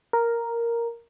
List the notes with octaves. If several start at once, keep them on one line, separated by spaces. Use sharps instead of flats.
A#4